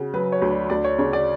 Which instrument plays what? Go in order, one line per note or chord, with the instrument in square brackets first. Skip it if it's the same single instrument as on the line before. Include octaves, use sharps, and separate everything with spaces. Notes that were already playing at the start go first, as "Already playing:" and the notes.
Already playing: [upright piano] C#3 [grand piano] F#4
[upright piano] F#3 [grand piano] B4
[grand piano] C#5
[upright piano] D2
[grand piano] D5
[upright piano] D2 [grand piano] D5
[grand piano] C#5
[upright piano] C#3 [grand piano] C#5
[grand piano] D5